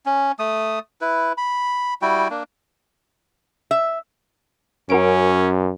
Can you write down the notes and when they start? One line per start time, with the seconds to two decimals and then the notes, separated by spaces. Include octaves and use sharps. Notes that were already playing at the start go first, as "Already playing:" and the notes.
0.06 C#4
0.39 A3 D#6
1.01 E4 B4
1.38 B5
2.02 G3 E4 F#4 G5
2.30 A#3 D4
3.71 E5
4.90 F#2 C#4 F#4 A#4 D7